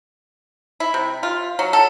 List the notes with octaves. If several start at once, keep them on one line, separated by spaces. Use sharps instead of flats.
E4
C3
F4
F#3
A4